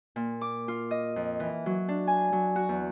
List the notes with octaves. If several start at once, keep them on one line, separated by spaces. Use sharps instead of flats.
A#2
D6
F4
D#5
F2
E3
F#3
D4
G#5
F#3
F#4
E2